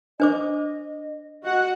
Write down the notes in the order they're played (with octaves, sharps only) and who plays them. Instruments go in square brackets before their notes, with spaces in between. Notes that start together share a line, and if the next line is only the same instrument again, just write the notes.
[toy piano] D4 C5 D6 [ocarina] D#5
[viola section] F#4 F#5 [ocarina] D#5